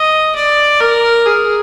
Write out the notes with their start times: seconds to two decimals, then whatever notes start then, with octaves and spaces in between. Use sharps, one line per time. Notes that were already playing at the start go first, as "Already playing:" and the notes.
Already playing: D#5
0.35 D5
0.80 A#4
1.26 G#4